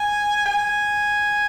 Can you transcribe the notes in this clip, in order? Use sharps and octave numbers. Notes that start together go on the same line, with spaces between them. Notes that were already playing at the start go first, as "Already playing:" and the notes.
Already playing: G#5
G#5